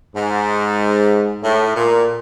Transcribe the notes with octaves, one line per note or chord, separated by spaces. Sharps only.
G#2
A2
A#2